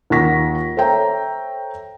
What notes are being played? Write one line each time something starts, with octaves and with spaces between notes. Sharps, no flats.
D#2 F4 F#5 C#6 A#6 B6
A4 C5 C#5 E5 G5 A#5